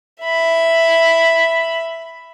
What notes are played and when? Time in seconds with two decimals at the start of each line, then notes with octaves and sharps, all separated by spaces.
0.23 E5 B5